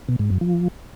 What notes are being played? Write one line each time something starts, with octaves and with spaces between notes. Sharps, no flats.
B2
G#2
F#2
F3